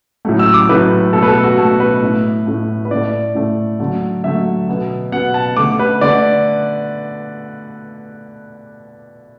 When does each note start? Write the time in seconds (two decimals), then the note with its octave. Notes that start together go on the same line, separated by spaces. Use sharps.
0.25 A2 F#3 A3
0.39 E6
0.54 D6
0.69 A2 F#3 A3 B4
1.13 B2 A3 A4
1.23 B4
1.28 A4
1.44 F#4
1.58 B2 A3 A4
1.80 B4
2.02 A2 A3
2.47 A2 A3
2.85 B4
2.91 A2 A3 D5
3.35 A2 A3
3.80 D3 F#3 A3
4.24 D3 F#3 A3 E5
4.68 B2 B3
5.12 B2 B3 F#5
5.34 A5
5.57 D3 A3 D6
5.79 B4
6.01 D3 A3 D5